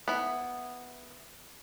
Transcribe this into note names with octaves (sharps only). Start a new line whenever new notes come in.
B3 E4